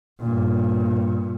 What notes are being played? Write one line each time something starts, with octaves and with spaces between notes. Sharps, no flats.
G2 A#2